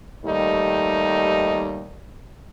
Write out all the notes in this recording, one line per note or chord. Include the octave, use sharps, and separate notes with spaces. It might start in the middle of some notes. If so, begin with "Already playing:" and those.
D#2 G3 A3 D#4